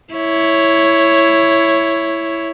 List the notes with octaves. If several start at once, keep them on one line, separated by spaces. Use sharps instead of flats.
E4 C#5